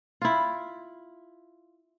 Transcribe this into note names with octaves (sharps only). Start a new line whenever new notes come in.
E4 F4